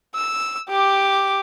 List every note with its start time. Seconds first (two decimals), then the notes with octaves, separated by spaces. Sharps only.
0.15 E6
0.69 G4 D6